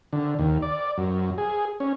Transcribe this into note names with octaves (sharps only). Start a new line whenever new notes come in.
D3
D#2
D5
F#2
G#4
C#4